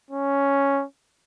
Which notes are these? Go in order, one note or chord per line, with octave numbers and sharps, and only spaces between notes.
C#4